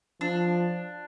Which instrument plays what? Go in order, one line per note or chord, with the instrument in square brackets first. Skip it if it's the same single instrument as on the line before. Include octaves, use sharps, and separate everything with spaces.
[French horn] F3 [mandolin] D4